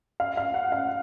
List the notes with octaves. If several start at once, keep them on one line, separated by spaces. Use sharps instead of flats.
F5
F5
F#5
F5